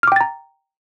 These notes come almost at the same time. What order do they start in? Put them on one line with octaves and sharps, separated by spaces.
F6 D6 G5 A6 A#5